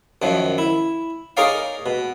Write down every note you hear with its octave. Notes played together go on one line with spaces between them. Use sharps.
F#2 D#3 F3
E4
D#4 G#4 A#4 C#5 D5 F5
B2